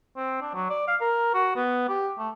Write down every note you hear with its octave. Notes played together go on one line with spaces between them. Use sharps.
C4
D4
F#3
D5
F5
A#4
F#4
B3
G4
A3